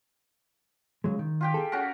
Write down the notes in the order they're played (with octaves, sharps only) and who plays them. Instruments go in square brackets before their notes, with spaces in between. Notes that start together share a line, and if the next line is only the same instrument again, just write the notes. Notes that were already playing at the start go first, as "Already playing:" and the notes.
[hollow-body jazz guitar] C#3 F#3 G#3
D#3
[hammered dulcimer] F4 G4 G5
[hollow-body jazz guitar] G#4 A4
[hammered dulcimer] C#4 F#4 A#4